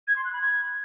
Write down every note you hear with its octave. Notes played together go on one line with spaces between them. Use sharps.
G#6
C6
F#6
B5
G#6